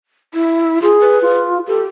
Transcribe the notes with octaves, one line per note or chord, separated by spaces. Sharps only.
E4
F4 G#4
B4
F4
G4 A4